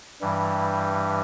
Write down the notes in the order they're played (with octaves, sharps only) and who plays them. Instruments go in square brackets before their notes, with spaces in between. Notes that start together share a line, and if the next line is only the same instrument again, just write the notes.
[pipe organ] G2 E3 G3